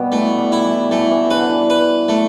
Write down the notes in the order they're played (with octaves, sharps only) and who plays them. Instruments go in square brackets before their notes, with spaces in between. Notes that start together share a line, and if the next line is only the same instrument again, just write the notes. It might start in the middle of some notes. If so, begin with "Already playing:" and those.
Already playing: [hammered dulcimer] B2 G3 B3
[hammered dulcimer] E3 [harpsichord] A3
[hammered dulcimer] G3
[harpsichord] E4
[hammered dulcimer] E3
[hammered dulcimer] E3 [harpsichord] A3
[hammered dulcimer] E3
[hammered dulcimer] D3 [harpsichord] B4
[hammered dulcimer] E3
[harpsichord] B4
A3